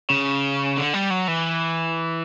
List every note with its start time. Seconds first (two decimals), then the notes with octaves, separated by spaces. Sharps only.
0.10 C#3
0.77 D3
0.94 G3
1.10 F#3
1.28 E3